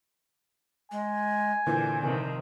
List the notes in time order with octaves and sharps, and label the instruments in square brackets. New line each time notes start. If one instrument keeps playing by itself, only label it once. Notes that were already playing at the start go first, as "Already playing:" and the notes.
[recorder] G#3 [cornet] G#5
[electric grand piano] A#2 D3 E3 [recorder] C5
[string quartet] C3 D#3 F3